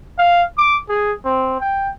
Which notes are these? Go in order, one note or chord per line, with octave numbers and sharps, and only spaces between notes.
F5
D6
G#4
C4
G5